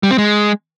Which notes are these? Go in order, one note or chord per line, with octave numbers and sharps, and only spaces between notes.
G3
C4
G#3